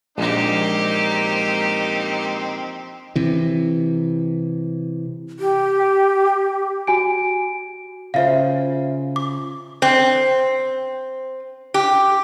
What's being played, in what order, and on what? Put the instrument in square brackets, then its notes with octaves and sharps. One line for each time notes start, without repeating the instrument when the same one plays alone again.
[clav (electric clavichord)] A#1 [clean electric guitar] G#3 [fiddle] A#3 G4 [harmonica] C4 D#4
[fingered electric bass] C3 E3
[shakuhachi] G4
[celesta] F#4 G#5 D7
[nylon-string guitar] C#3 F4 C5 [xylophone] E5 F5
[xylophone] D6
[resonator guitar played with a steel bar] C4
G4